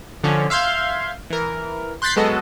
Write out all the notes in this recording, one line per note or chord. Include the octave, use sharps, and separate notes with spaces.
D3 F3 C#4
E5 F5 C6 G6 G#6
E3 A#4
C6 F#6 G6 A6 B6 C7
F#3 G#3 B3 F#4 A4 D#5